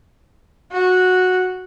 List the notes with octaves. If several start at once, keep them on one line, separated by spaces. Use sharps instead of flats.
F#4